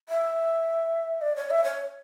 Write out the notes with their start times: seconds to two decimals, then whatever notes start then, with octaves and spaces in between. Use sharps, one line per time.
0.09 E5
1.21 D5
1.36 C#5
1.50 E5
1.64 C#5